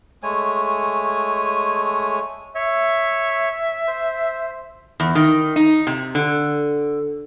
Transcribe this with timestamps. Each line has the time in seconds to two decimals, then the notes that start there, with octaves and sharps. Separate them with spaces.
0.23 G#3 A3 C#5 G#5
2.55 C#5 E5
3.87 C5
5.00 E2
5.15 D#3
5.56 D#4
5.87 C3
6.15 D3